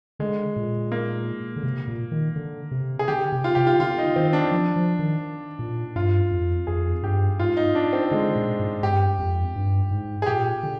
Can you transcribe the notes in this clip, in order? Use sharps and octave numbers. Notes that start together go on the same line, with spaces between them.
D3 G#3
A#2
A#3
D3
C3
A#2
D#3
D3
C3
G#4
D3 G4
C3
F4
C3 G4
F4
D3 F4
D#4
D#3 C4
D4
F3
F3
D#3
A#2
G2 F4
F2
F2 G#4
G2 G4
G#2 F4
D#4
D4
C4
D3 G#3
A#2
G#2
G2 G4
F2
G2
G#2
G#4
A#2 G4
D3